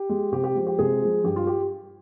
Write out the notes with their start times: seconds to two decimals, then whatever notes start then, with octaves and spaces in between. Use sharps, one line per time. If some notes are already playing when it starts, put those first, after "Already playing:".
Already playing: G4
0.09 G#3
0.32 C3 G4
0.44 G4
0.55 F3 G#3
0.67 G4
0.79 C3 G#3 G#4
1.01 F3 G#3
1.24 G2 G4
1.36 F4
1.47 G4